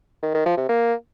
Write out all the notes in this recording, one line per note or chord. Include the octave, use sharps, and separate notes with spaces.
D#3
D#3
F3
C3
A#3